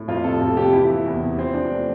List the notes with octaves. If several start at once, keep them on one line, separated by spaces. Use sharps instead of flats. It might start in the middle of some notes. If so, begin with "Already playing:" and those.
Already playing: A2
F2 F4
C3 A4
F2 A4
C3 G4
E3 E4
E3
E2
C3
F3 C4
F3 D4
A3